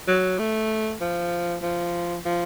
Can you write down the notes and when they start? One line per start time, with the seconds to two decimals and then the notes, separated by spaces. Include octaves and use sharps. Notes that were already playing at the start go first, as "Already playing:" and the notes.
0.07 F#3
0.39 A3
1.01 F3
1.62 F3
2.25 F3